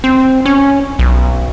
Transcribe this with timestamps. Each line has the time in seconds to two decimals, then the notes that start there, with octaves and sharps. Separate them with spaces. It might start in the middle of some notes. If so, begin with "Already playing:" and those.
0.04 C4
0.46 C#4
0.99 B1